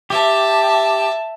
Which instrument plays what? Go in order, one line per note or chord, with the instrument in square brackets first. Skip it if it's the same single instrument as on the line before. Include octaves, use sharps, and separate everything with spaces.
[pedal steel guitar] G4 [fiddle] E5 A5